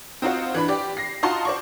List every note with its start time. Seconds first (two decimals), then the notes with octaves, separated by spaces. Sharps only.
0.22 C4 D#4 F4 F#4 C5
0.54 E3 D4 B5
0.68 G4 D5
0.97 A#6 C7
1.23 D#4 F4 F#4 A5 C6
1.45 C5 D5 C#6